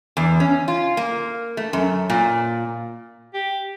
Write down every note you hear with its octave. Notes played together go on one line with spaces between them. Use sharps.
E2
C#4
F4
A#3
A3
F#2
A#2
G4